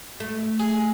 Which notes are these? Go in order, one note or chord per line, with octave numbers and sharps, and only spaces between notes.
A3
G#4